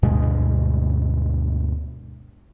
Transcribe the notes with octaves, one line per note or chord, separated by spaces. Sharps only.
D2 G2 B2 G#3